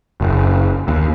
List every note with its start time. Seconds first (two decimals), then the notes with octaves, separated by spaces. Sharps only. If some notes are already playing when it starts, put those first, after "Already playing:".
0.21 F#1
0.88 D#2